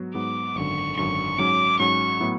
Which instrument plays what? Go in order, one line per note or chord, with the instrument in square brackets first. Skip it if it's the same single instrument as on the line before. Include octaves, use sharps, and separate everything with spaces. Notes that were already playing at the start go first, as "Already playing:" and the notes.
Already playing: [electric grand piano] G#2 F#3 B3 F#4
[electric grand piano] G#2 F#3 B3 F#4 [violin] D6
[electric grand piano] G#1 F#2 D3 [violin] C#6
[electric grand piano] G#1 F#2 D3 [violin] C#6
[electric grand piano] G#2 F#3 C#4 [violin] D6
[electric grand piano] G#2 F#3 C#4 [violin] C#6
[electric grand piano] A2 F#3 B3 E4